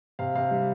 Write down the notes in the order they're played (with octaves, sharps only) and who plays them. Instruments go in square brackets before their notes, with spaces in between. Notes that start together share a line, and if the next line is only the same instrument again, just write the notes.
[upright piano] C3 F5
C3 F5
G3